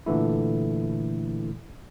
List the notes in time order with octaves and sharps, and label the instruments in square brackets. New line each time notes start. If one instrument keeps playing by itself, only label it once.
[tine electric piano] A#2 D3 E3 A3 E4